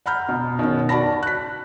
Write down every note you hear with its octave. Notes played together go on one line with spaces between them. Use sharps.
F#5 A#5 B5 F6 G6
B2
B2 D#3 C#4
F#4 D5 A5 B5 A#6
F#6 B6